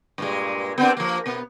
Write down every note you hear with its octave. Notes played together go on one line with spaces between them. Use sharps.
G2 A#2 G#3
B3 C4 D4
F3 A#3
B2 B3